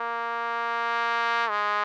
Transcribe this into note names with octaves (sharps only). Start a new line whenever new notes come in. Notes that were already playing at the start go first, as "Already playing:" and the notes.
Already playing: A#3
G#3